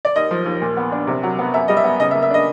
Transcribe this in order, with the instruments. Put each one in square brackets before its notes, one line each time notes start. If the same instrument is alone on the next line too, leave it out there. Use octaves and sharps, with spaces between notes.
[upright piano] D5
D#2 D#5
F3
D#2
A#2
B3
D4
C3
F#3
B3
F#2 E5
G3 D#5
E5
B3
C#3 D#5
E5
A#3
E5
D4 D#5